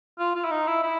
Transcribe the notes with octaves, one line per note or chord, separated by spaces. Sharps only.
F4
F4
E4
D#4
E4
E4